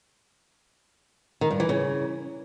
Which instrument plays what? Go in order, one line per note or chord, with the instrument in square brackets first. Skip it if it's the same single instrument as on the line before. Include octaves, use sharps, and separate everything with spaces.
[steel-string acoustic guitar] D#3
G2
E3
C#3